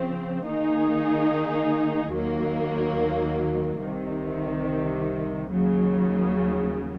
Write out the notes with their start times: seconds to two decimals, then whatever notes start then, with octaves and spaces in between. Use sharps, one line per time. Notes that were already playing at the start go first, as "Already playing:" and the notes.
Already playing: C#3 F3 C4
0.45 D#3 A#3 D#4 G#4
2.13 D#2 D#3 F#3 A#3
3.82 C2 C3 D#3
5.51 D#2 C#3 F#3